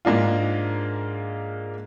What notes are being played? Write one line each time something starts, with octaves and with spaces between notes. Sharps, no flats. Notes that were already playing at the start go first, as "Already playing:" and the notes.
G#2 A#3 D4 F4